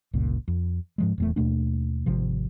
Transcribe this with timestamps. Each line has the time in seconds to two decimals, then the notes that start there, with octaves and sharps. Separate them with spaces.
0.13 G1 C#2 A#2
0.48 F2
0.98 G#2 F3 G#3
1.18 D#1 E2 A3
1.36 D#2 B2 A3 D4
2.06 G#1 C3 F3